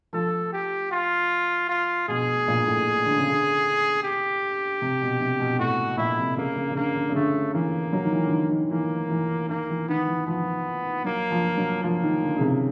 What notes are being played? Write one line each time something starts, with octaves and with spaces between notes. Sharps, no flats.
F3 A4
G4
F4
F4
B2 G#4
A#2
A2
D3
C#3
D3
G4
C3
B2
C3
B2
A2 F#4
A#2 E4
C3
C#3 A#3
C#3
C#3
D3 A#3
D3
C#3
D3 A3
E3 A#3
F#3
D#3
E3
D3
D#3
D#3
E3 A#3
E3
D#3 A#3
E3
D#3 B3
E3
F3 B3
F#3 A#3
F3
F#3
F3 A#3
D#3
D3
C#3
C3